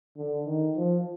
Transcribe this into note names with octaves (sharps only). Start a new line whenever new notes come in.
D3
D#3
F3